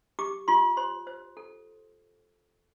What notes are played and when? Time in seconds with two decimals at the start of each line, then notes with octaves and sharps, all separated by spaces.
0.19 G4 D6
0.48 F4 C6
0.77 C5 C6
1.07 C5
1.37 A4